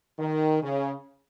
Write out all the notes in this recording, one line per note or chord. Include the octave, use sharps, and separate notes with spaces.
D#3
C#3